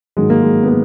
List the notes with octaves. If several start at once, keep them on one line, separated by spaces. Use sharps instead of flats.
G#2 D#3 F#3 G#3
A#3
G#3
B3
A#3